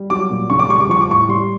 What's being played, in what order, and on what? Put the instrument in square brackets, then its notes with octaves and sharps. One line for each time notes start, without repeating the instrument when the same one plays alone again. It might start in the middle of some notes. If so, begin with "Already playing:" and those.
Already playing: [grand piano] G3
F#3 D6
A#2
C#3 C#6
D6
G3 C#6
D6
F3 C#6
D6
A2 C#6
G3 C6